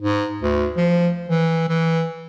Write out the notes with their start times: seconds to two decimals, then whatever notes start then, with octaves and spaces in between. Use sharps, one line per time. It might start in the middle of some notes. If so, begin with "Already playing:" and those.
0.01 G#2
0.42 D2
0.77 F3
1.29 E3
1.69 E3